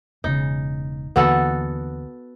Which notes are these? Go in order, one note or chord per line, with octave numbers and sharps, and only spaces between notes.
E1 C#3 D#4
D#2 D3 E3 B3 F#4 A4